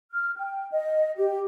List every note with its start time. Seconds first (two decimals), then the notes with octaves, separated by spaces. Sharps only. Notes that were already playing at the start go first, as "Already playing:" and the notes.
0.12 F6
0.37 G5
0.72 D#5
1.17 G4